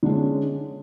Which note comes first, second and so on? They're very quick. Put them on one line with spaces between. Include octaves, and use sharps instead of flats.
D3 G#3 C#4